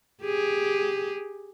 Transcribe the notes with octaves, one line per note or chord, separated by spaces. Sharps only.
G4 G#4